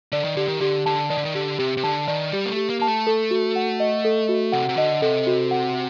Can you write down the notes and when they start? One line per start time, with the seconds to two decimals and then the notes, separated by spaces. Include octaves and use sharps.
0.12 D3 D5
0.24 D#3
0.36 D3 G4
0.48 D#3
0.61 D3 G4
0.86 D3 A5
1.10 D#3 D5
1.17 D3
1.25 D#3
1.35 D3 G4
1.59 C3 G4
1.77 C3
1.84 D3 A5
2.08 D#3 D5
2.32 G3 G4
2.46 A#3
2.51 A3
2.57 G4
2.70 A#3
2.80 A#3 A5
2.88 A3
3.07 A4
3.31 F#4
3.56 F#5
3.80 D#5
4.05 A4
4.29 F#4
4.52 C3 F#5
4.69 C3
4.77 D3 D#5
5.02 C3 A4
5.27 F#4
5.51 F#5